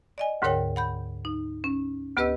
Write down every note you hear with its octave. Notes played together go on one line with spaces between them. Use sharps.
D5 D#5 G#5
D2 G#2 D3 A#4 C#5 G5
F#5 B5 G6
D#4
C#4
D2 B3 G4 B4 D#5 E6